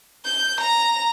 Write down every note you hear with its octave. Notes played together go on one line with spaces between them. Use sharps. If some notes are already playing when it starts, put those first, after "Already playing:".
G6
A#5